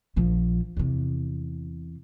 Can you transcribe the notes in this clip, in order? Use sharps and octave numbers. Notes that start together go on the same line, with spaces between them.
A#1 F3
E2 C3